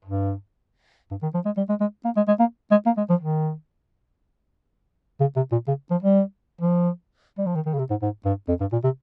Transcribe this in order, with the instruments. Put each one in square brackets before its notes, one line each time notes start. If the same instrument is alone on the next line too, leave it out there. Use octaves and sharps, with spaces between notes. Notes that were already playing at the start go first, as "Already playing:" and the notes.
[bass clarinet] G2
G2
D#3
F3
G#3
G3
G#3
G#3
A#3
G#3
G#3
A#3
G#3
A#3
G#3
F3
D#3
C#3
C3
A#2
C#3
F3
G3
F3
G3
F3
D#3
D#3
C#3
C3
G#2
G#2
G2
F2
G2
A#2
C3